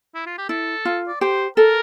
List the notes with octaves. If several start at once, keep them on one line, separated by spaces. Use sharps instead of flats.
E4
F4
G4
E4 A4
F4
D5
G4 C5
A4 A#4